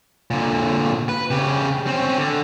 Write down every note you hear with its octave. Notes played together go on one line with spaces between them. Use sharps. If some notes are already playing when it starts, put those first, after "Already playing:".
A#2 D3
B4
C#3 G4
C4 C#4
D3